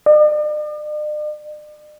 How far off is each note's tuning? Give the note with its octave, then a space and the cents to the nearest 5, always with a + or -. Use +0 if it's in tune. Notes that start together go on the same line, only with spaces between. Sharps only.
D5 +45